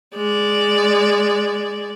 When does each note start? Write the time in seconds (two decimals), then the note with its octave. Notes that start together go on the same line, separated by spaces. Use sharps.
0.15 G#3 D5